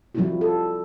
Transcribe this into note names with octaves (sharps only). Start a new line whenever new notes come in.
F3 G3 C4 D#4 E4 F#4
A4